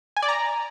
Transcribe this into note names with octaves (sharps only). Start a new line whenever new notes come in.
G#5
D5
A#5